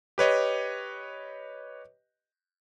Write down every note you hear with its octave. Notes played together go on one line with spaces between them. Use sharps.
G4 B4 C#5 D#5